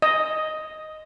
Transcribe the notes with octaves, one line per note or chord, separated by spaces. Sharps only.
D#5